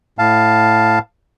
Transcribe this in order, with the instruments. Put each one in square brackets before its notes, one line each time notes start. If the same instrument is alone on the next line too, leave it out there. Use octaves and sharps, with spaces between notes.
[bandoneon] A2 F5 A5